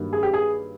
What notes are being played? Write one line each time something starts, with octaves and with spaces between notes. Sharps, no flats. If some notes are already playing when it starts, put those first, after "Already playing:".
Already playing: G2 D#3 F#3 A#3
G#4
G4
G#4